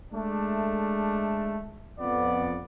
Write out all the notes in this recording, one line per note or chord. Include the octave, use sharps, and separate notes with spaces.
G#3 A3 D4
F2 B3 D5